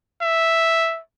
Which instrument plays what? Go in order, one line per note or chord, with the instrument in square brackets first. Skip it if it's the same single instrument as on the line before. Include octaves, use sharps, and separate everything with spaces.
[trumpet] E5